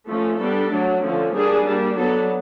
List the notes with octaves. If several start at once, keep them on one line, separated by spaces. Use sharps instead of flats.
F3 A3 C#4
G3 B3 D4 A4
F#3 A3 D4
D3 F3 A3 C#4
G3 A#3 D4 G#4
G3 A#3 D4
F#3 B3 D4 A4